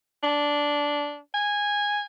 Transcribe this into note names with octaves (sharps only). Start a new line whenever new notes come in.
D4
G#5